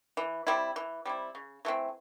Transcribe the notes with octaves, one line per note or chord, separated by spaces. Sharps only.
E3
G3 C4 E4
E3
G3 C4 E4
C#3
E3 A3 C4